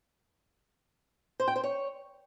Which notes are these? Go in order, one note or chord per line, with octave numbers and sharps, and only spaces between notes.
C5
G5
C5
C#5